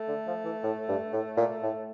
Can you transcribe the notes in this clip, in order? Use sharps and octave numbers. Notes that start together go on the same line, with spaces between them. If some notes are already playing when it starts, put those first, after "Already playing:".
Already playing: A3
D3
F3
E3
A2
G2
A2
A#2
A2